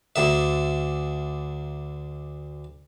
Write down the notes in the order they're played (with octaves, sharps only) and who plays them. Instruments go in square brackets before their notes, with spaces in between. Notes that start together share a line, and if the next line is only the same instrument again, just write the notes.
[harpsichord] D2 D3 E5